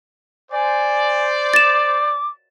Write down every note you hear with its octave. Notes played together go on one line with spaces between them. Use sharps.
C5 D5 G#5
D6 A6 E7